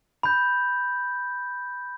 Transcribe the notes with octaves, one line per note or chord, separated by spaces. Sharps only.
B5 G6